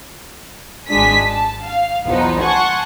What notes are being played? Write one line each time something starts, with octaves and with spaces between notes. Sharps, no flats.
G#1 G#3 D4 G#5 B6
A5
F5
B1 E2 F3 B3 D#4
F#5 G#5 A5 C6 C#6